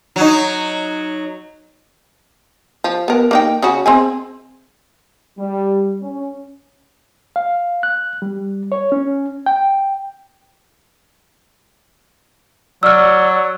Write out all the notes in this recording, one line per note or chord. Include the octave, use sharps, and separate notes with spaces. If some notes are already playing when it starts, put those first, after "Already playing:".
F#3 D#4
F3
B3 A#4
A#3 D#4 G5
C#3 C#4 F#4
C4 G#4 G#5
G3
C#4
F5
F#6
G3
C#5
C#4
G5
F#3 D5 E6 F6